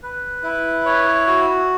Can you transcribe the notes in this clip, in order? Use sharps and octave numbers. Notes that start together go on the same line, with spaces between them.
B4
E4
C#5
F#4